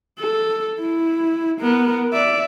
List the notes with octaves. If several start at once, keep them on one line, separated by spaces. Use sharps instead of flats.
A4
E4
B3 A#4
D5 E5